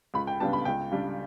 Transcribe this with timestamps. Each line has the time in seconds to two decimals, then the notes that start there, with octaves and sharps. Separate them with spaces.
0.14 C#2 B5
0.27 G5
0.40 C#3 G3 B3 D4 A5
0.53 B5
0.65 C#2 G5
0.91 C#3 G3 D4